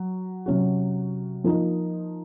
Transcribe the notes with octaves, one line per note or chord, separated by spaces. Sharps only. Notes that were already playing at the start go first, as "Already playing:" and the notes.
Already playing: F#3
C3 F#3 C#4 F#4
F3 A#3 D#4 A#4 D#5